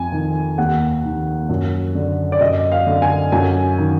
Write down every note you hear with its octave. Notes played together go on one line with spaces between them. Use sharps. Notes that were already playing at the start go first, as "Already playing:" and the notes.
Already playing: F2 G#5
D#3
D#2 F#5
D#3
F#2
D3
D5
F#2 D#5
F5
D3
G#5
F#2 G#5
D#3